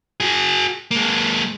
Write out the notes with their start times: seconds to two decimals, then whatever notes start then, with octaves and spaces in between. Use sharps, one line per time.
0.20 F#4 G#4
0.91 G#3 A#3